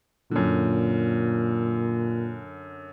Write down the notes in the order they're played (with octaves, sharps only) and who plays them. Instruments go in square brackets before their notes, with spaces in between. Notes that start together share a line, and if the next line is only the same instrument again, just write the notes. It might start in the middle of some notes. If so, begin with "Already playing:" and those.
[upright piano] F#2 D3 [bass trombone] A#2